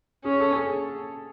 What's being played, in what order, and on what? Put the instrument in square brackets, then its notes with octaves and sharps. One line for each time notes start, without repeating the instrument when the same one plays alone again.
[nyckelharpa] C#4 [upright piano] G#4
[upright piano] A4
G#4